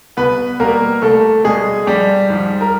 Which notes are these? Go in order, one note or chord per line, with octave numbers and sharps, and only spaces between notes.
C2 B3 B4
B2 G3 A#3 A#4
C2 A3 A4
B2 G3 G#3 G#4
A#1 G3 G4
G#2 F3
A#4